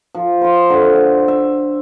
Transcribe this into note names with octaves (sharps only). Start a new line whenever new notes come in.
F3
C5 F5 C6
D3
E5